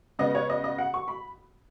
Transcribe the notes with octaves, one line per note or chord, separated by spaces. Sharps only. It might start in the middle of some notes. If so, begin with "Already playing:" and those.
C#3 G#3 B3 D#5
C#5
D#5
D#5
F#5
C#6
B5